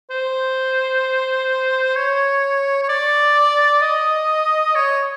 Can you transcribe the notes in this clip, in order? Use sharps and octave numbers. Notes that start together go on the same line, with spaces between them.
C5
C#5
C#5
D5
D#5
C#5